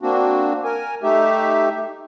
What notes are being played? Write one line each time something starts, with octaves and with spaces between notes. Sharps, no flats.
A#3 C4 D4 F#4
A#4 G#5
A3 D#4 G4 E5